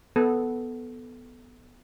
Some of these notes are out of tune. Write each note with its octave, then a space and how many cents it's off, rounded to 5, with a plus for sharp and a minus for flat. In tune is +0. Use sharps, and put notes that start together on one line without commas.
B3 +0 A4 -5